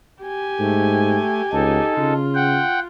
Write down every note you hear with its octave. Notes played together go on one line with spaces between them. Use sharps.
G4 G#5
G#2 A3
C#2 D#4 A4
C#3 F4
F#5 G5